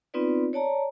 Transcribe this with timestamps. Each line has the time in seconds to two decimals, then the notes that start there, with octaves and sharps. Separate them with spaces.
0.14 B3 C4 D#4 F4 B4 D5
0.53 C#5 D5 A5 A#5